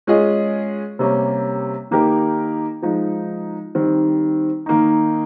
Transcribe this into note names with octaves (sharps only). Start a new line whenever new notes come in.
G#3 C#4 F4 G#4 D#5
C3 G3 A#3 C#4
D#3 A#3 D#4 G4 A#4
F3 G#3 D#4
D#3 G3 C4
D#3 A#3 D#4